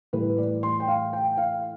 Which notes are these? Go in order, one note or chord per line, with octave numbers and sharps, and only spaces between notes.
A2 E3 G3 B4
D5
C6
G5
F5
G5
F5